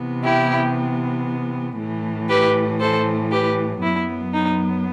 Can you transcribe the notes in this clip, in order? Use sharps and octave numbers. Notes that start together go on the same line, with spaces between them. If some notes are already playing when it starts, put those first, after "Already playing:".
Already playing: C3 E3 B3
E4 G4
A2 E3 A3
G4 B4
A4 C5
G4 B4
F#2 F#3 B3 E4
D#4